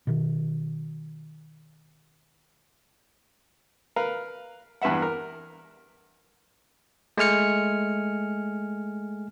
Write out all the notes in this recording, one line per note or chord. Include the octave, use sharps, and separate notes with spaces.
B2 D#3
A#4 B4 F5
E2 G2 B4 E5 F#5
A#4
G#3 A3 G#5 F6 C#7